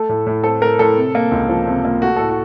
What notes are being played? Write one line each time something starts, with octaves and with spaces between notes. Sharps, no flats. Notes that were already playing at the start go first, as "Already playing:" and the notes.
Already playing: A3 A4
A2
A2
C4 A4
A3 A#4
A2 A4
C3
A#3
C#2
F3
C3
A#3
A3 F#4
A2 A4
F#4